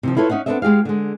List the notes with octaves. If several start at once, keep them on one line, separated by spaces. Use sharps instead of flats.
C3 D#3 F3
E4 F4 A4 B4 C#5
C#4 D#4 E5 F#5
B3 C4 D4 A4 D#5 E5
G#3 G4 G#4 F5
D3 G#3